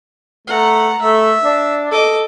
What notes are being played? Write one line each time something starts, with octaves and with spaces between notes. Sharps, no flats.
A3 F#5 A#5
A3 E5
D4
A4 D#5 D6